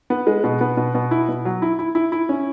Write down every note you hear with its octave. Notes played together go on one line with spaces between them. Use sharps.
B3
G#3
B2
B3
B2
B2
E4
B2
F#3
E4
E4
E4
E4
C#4